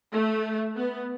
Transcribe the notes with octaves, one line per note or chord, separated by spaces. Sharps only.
A3
B3